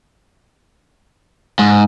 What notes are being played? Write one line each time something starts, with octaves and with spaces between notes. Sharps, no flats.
G#2